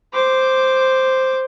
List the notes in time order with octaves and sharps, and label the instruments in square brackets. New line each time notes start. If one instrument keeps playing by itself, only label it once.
[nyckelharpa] C5 D6